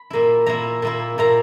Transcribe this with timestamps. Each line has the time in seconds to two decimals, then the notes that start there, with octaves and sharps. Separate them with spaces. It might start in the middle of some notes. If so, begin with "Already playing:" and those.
Already playing: B5
0.10 A#2 A#3 E4
0.46 A#2 A#3 E4 A#5
0.82 A#2 A#3 E4
1.18 A#2 A#3 E4 A#5